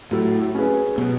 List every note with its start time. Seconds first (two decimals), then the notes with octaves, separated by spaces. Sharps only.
0.12 A2 F#3
0.55 C#4 G#4 B4
0.98 B2 F#3